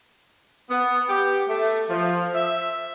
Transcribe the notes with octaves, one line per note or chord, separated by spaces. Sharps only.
B3
G4
A3
F3
E5